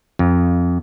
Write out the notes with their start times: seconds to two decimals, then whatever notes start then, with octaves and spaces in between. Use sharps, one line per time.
0.19 F2